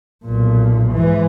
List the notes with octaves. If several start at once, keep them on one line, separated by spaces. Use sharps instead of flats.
B1 A#2
G#2 E3